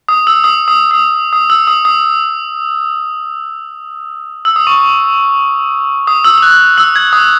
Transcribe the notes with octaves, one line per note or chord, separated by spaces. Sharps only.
D#6
E6
D#6
D#6
D#6
D#6
E6
D#6
D#6
E6
D#6
C#6
D#6
E6
E6
F#6
E6
G#6
D#6